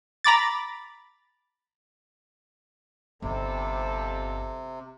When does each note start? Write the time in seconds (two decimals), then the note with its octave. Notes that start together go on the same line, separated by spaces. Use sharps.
0.24 A#5 B5 D6 A6
3.22 G1 F2 C3 G3 D#4 A4